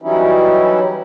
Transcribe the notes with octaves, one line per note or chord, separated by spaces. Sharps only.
E3 F#3 G3 C#4 D#4 E4